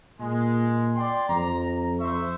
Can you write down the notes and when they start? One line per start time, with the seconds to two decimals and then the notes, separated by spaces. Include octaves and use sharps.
0.20 A#2 G#3
0.96 D5 G5 C6
1.29 F2 A#5
2.00 C5 E5 C#6